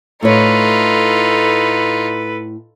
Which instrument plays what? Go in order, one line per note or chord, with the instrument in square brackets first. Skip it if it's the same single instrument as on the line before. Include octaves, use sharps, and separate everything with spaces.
[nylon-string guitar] A2 C#5 [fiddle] D#4 F4 [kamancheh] A4 B4